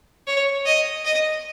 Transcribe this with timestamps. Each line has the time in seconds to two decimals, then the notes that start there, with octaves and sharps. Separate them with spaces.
0.27 C#5
0.66 D#5
1.05 D#5